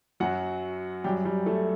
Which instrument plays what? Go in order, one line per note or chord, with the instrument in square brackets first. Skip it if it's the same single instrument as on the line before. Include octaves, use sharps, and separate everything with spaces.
[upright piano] F#2 F#3 F#4 F#5
F#2 F#3 G3 G4
G3 G4
A3 A4